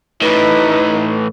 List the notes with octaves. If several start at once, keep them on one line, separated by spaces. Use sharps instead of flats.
A2 E3 D#4 B4